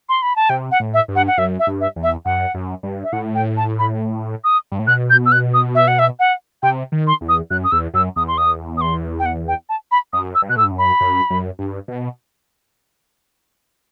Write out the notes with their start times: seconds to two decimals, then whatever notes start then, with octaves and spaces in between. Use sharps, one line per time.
0.09 C6
0.22 B5
0.36 A5
0.49 C3 G5
0.71 F#5
0.80 A2
0.94 E5
1.08 G2
1.15 F#5
1.27 F#5
1.38 F#2 E5
1.59 E5
1.67 G2
1.81 E5
1.96 E2
2.03 E5
2.25 F#2 F#5
2.54 F#2
2.83 G2
3.04 E5
3.12 A2 F#5
3.35 G5
3.57 A5
3.79 B5
4.44 D#6
4.72 G2
4.79 A2
4.87 B2 F#6
5.10 G6
5.26 E6
5.32 F#6
5.54 D#6
5.75 E5
5.88 F#5
5.99 E5
6.19 F#5
6.63 C3 G5
6.92 D#3
7.07 C6
7.21 E2
7.29 D#6
7.50 F#2 F#6
7.64 D#6
7.72 E2 E6
7.94 F#2 E6
8.16 E2 D#6
8.28 C6
8.38 D#6
8.77 D#6
8.81 C6
9.19 G5
9.26 F#5
9.48 G5
9.69 A5
9.91 B5
10.13 F#2 D#6
10.35 E6
10.42 G2
10.49 B2 F#6
10.56 A2 E6
10.64 G2
10.71 F#2
10.78 B5
11.01 F#2
11.30 F#2
11.59 G2
11.88 B2